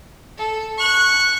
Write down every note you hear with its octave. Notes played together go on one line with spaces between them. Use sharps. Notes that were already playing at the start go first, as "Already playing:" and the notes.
A4
C#6 F#6